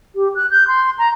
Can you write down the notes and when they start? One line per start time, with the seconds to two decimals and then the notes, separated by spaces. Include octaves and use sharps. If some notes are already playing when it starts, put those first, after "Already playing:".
0.15 G4
0.35 F#6
0.50 G6
0.67 C6
0.98 A#5